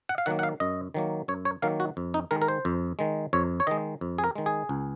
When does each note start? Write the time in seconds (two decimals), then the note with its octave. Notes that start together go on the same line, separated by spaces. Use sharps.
0.09 F#5
0.18 F5
0.26 D#3 F#3 A#3 F#5
0.39 F#5
0.43 F5
0.60 F#2 D#5
0.94 D#3 F#3 A#3
1.28 F#2 C#5
1.45 C#5
1.62 D#3 F#3 A#3 F5
1.80 F#4
1.97 F2
2.14 D#4
2.31 D#3 G#3 A#4
2.42 A#4
2.48 C5
2.65 F2
2.99 D#3 G#3
3.33 F2 C#5
3.60 C#5
3.67 D#3 G#3 D#5
4.01 F2
4.18 G#4
4.24 A#4
4.36 D#3 G#3
4.46 G#4
4.69 C#2